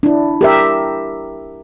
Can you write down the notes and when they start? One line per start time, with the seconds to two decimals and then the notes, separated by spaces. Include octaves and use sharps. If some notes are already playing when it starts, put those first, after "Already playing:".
0.03 D4 E4
0.41 G4 A#4 E5